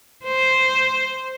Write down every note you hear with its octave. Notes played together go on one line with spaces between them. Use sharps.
C5